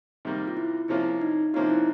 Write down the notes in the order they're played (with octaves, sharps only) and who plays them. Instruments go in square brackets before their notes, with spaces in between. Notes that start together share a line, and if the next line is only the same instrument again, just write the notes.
[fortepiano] C3 D#3 G3 A#3
[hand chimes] F4
E4
[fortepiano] C3 F3 A#3 C#4 F4 [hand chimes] E4
[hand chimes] D#4
[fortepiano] C3 F3 A#3 C#4 F4 [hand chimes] D#4
[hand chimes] E4